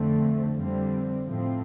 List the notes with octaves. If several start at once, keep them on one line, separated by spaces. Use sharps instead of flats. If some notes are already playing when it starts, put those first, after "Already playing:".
Already playing: F2 D3 A3 C4
F2 D3 G3 C4
A2 F3 A3 C4